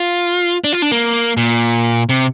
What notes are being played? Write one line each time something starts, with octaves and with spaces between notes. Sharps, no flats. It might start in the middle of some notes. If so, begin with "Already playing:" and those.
Already playing: F4
D4
F4
D4
A#3
A#2
C3